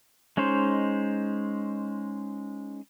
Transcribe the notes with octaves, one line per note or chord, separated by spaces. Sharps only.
G#3 C#4 D#4 C5